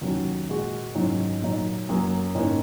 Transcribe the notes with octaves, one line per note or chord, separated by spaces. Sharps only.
D#2 D#3 F#3 C#4 F#4
A#2 G#3 F#4
G#2 D#3 F#3 C#4
A#2 F#3 D#4
F#2 F#3 A#3 C#4
G#2 D#3 A#3 C#4